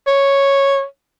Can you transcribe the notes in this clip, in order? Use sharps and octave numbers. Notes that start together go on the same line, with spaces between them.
C#5